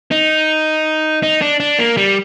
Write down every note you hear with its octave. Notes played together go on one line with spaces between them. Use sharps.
D#4
D#4
D4
D4
A#3
G3